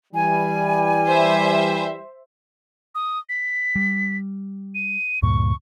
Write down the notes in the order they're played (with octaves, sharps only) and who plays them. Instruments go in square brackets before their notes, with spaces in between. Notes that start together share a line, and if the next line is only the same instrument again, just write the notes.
[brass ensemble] E3 G3 [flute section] G#5
[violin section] C5 E5
[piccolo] D#6
B6
[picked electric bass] G3
[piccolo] D#7
[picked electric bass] D2 G2 A#2 [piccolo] C#6